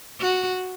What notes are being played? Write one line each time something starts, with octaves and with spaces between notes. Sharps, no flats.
F#4